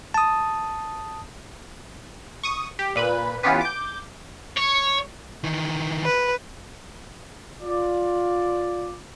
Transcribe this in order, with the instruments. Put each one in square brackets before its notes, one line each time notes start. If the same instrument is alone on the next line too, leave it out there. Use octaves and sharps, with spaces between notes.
[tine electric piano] A5 D#6
[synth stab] C#6 D#6 D#7
G4
A#2 B4 B5
E3 B3 C#4 F4 G4 B4
D6 G6
[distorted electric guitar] C#5
[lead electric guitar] D#3 E3
[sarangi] B4
[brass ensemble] F4 D5